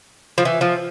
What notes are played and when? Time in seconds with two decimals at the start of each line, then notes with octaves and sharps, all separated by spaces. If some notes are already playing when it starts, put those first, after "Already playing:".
0.38 F3
0.45 E3
0.61 F3